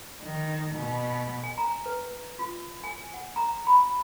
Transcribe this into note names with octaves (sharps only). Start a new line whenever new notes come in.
D#3
B2
G#5
A#5
B4
F4
G#5
F#5
A#5
B5